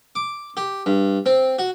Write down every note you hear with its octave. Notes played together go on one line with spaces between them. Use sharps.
D6
G4
G2
C4
F#4